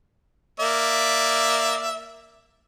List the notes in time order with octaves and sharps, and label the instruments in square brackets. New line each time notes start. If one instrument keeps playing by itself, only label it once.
[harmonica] A#3 D5 E5